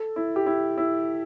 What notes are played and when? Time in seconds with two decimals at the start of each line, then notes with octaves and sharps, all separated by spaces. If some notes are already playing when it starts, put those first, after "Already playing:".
Already playing: A4
0.16 E4
0.36 G4
0.46 E4
0.78 E4